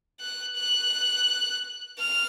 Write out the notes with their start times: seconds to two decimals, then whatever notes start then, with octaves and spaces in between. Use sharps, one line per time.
0.20 F#6
0.56 F#6
1.99 F6